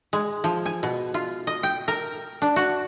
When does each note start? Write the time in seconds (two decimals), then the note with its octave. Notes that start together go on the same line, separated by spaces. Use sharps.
0.13 G#3
0.44 F3
0.66 G#5
0.83 B2
1.14 F4
1.47 D#5
1.63 G5
1.88 A#4
2.42 D4
2.56 F#4